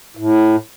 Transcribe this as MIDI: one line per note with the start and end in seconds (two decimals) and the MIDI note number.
0.17 0.56 45